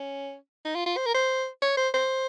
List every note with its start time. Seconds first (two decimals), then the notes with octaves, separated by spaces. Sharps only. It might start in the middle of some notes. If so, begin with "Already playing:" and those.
Already playing: C#4
0.65 D#4
0.75 F4
0.86 F4
0.97 C5
1.06 A#4
1.15 C5
1.62 C#5
1.77 C5
1.94 C5